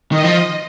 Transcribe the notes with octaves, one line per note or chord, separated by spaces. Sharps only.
D#3 D#5
F3